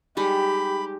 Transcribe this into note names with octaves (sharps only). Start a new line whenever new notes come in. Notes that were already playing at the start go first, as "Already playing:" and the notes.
G3 G#3 D#4 G4 B5